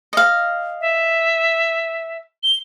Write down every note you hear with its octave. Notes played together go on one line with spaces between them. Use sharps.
D#5 F5
E5
G7